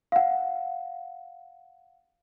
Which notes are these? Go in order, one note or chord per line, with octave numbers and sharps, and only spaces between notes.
F5 F#5